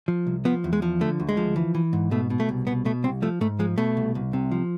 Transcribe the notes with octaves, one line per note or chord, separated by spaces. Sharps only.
F3
C2
F3 B3
E2
G#3
F3
D3 A3
D2
G#3
F3
E3
E3
G#2
B2 A3
B2
A3
C2
B2 B3
B2 A3
C2 C4
F3 A3
G#2 A3
F3 G#3
B2 A3
C2
C2
C3
F3